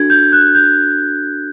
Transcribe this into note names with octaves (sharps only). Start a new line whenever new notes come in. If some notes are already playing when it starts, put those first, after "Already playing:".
Already playing: D4 F#4 A4 G#6
G6
F#6
G6